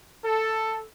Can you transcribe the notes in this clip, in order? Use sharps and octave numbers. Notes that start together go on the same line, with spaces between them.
A4